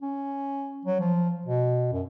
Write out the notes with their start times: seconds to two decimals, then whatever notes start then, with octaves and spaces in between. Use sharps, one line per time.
0.02 C#4
0.85 F#3
1.00 F3
1.46 B2
1.92 F#2